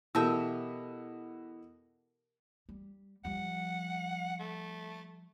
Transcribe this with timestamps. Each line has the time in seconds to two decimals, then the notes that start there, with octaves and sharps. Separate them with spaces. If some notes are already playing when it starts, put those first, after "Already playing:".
0.15 B2 E3 A3 G4 A#4 E5 A5 E6
2.69 G3
3.25 F3 G3 F#5
4.40 A3